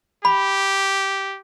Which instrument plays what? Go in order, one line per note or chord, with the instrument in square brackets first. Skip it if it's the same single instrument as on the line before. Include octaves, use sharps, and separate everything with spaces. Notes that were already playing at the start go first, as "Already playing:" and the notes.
[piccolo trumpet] G4 [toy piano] B5